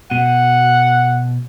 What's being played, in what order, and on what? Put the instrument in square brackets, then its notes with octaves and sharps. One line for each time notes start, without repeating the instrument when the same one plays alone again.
[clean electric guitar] B2 [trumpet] F#5